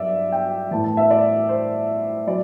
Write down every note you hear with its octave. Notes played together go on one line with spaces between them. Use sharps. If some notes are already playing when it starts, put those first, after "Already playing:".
Already playing: G2 F#3 D5 E5
G5
A2 E3 A5
A5
E5
D5
C5
F#3 D5